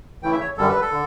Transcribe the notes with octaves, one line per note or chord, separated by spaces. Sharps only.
C#3 E3 A3 E4 G5
E5
C#5
F#2 D3 G3 A4
B4
A4
D3